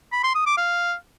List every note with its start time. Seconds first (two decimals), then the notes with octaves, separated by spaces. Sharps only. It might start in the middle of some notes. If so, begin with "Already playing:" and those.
0.13 B5
0.24 C6
0.35 D#6
0.46 D6
0.57 F5